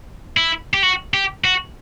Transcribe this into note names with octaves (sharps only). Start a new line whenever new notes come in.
E4
G4
F#4
G4
F#4